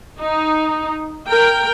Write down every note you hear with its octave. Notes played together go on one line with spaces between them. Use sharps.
D#4
A#4 G5